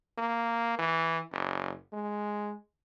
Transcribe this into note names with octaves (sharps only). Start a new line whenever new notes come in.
A#3
E3
F#1
G#3